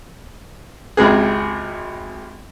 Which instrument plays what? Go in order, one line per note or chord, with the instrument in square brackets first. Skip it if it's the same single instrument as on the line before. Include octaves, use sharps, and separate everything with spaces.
[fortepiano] G#1 C#2 C3 G#4